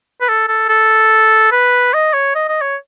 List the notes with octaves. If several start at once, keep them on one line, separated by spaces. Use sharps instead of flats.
B4
A4
A4
A4
B4
D#5
C#5
D#5
D#5
C#5